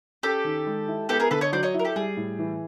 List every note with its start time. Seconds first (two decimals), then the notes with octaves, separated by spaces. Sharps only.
0.23 C#4 G4 A4
0.44 D#3
0.66 G#3
0.88 E4
1.09 B3 G4 A4
1.20 G#4 A#4
1.31 D3 A4 B4
1.41 C#5 D#5
1.52 F#3 C5 D5
1.63 C#5 D#5
1.74 E4
1.79 A#4
1.85 G4 A4
1.96 G3 G#4
2.17 A2
2.39 E3